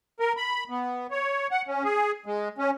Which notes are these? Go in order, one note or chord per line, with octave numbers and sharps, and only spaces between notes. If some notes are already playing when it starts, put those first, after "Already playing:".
A#4
B5
B3
C#5
F#5
C#4
G#4
G#3
C#4